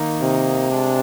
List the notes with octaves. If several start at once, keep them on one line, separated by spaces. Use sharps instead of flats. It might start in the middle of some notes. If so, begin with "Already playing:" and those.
Already playing: D#3 A#3 D#4
C3
G#3 D4